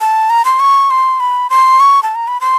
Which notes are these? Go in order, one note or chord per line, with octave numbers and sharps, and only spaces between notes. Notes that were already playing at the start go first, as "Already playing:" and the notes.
A5
A#5
C6
C#6
C6
B5
C6
C#6
A5
A#5
B5
C6